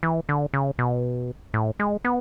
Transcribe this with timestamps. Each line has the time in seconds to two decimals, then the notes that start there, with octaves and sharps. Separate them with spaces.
0.03 E3
0.29 D3
0.54 C#3
0.79 B2
1.54 A2
1.79 G#3
2.05 B3